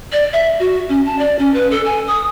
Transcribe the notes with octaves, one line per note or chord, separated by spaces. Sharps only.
D5
E5
F#4
C#4
A5
D5
C#4
B4
A4
G#5
D#6